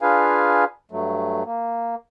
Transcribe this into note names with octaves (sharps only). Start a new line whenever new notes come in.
D4 F4 G#4 B4 F5 G#5
G2 F#3 A3
A#3